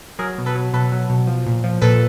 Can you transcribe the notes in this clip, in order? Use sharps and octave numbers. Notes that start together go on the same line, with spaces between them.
F#3 G#4 A#4
B2
A4 B4
F#3
B2 A4 B4
F#3
B2
F3
A#2
F3
A#2 A4 B4